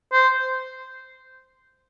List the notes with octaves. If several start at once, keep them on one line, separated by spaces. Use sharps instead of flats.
C5